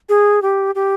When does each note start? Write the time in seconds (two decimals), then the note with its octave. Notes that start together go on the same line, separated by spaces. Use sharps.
0.09 G#4
0.42 G4
0.75 G4